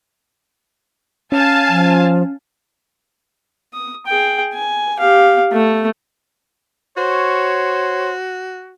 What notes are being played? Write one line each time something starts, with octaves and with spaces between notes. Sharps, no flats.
C#4 F5 G#5 A5
F3
D#6
G#4 G5
G#5
G4 F5
A3
F#4 C5 C#5